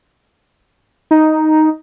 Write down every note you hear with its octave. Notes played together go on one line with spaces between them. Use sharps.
D#4